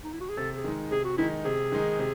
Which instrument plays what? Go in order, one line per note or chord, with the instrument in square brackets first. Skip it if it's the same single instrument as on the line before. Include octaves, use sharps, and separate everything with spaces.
[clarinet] D#4
E4
F#4
G#4
[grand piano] C3 [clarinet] A4
[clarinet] G#4
[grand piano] D#3 G#3 D#4
[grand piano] C3 [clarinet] G#4
[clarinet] F#4
[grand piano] D#3 G#3 D#4 [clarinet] E4
[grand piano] C3 [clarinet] G#4
[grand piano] D#3 G#3 D#4
C3